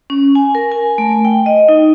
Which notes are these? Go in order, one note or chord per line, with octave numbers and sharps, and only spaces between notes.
C#4
G#5
A#4
G#5
A3
G5
D#5
D#4